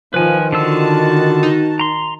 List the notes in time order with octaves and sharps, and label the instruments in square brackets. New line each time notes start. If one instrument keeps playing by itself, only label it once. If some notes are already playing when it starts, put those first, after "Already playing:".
[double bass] D#3 [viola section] F3 [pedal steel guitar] B4 G#5
[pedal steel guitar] D3 F4 E6 [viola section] F#4 A5
[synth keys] D#4
[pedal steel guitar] A#5 C6